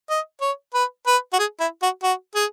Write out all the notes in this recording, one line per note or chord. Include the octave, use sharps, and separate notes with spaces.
D#5
C#5
B4
B4
F#4
G#4
E4
F#4
F#4
G#4